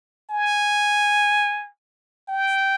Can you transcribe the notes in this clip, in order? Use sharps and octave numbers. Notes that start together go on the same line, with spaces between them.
G#5
G5